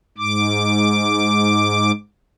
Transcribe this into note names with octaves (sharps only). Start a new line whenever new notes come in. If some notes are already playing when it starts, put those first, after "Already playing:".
G#2 D6